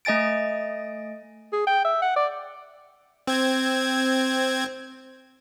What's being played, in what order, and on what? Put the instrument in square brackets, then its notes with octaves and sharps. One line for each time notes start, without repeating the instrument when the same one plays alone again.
[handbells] A3 D#5 G#5 A6 D7
[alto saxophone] G#4
G5
E5
F#5
D5
[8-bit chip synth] C4 G#6